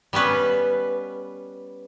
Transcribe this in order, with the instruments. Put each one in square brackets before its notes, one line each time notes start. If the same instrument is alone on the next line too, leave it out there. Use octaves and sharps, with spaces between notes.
[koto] G3 B3 C#4 B4